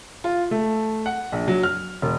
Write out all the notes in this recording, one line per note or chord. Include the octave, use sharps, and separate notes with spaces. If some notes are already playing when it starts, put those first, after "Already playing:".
F4
A3
F#5
A#1
F#3
F6
E1